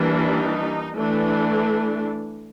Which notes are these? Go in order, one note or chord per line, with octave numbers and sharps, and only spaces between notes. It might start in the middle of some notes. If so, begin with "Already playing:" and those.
Already playing: E3 G3 A#3 D4
D#4
E3 A3 D4